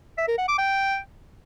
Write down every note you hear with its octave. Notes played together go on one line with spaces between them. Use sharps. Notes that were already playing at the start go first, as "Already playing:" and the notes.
E5
A#4
F#5
D6
G5